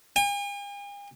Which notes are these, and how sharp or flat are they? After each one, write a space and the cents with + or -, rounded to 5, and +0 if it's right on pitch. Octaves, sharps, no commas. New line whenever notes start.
G#5 -45